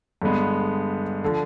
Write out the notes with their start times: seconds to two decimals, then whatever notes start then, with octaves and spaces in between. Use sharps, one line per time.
0.22 G2 D3 G#3 B3
1.24 D3 F3